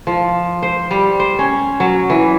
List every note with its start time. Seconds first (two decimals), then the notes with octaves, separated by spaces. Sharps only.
0.07 F3
0.62 C5
0.91 G3
1.20 C5
1.39 C#4
1.80 F#3
2.10 E3